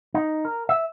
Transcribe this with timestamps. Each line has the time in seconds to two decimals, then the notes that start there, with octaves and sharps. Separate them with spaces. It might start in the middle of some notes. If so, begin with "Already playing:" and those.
0.14 D#4
0.45 A#4
0.69 E5